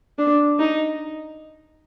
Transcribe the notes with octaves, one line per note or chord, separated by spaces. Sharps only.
D4
D#4